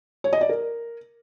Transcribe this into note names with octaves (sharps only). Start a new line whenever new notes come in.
C#5
D#5
D5
A#4